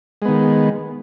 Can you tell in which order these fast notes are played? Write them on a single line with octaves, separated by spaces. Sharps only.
G#3 B3 D#3